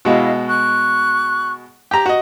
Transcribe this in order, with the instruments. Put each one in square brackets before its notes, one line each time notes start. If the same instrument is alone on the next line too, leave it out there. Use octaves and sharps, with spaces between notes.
[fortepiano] B2 G#3 F#4 [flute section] E4 D#5 F5
[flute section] C#6 F#6
[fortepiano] G4 A#5
F#4 D#5